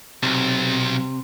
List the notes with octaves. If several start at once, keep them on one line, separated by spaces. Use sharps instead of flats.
B1 C3